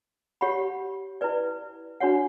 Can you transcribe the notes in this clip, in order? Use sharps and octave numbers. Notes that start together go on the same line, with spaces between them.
G4 C#5 F#5 B5
E4 B4 D5
D4 F#4 C#5 F#5